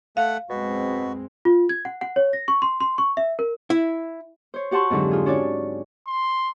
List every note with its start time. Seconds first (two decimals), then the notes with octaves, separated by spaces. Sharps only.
0.17 A3 F5 F#5
0.50 F#2 B2 G#3 C4 F#4
1.45 F4
1.69 G#6
1.85 F#5
2.01 F#5
2.16 C#5
2.33 A#6
2.48 C#6
2.62 C6
2.80 C6
2.98 C#6
3.17 E5
3.39 A#4
3.70 E4
4.54 C5 C#5
4.71 F#4 G4 F#5 A5 C6 C#6
4.90 F2 G#2 D3 F#3
5.11 F4 G#4
5.26 C#4 D4 F#4 C#5 D5
6.07 C6